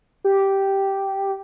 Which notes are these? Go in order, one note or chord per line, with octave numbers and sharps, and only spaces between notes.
G4